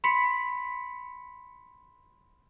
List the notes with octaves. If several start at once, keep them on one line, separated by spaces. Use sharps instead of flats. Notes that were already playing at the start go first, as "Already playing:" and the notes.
B5 C6 B6 C#7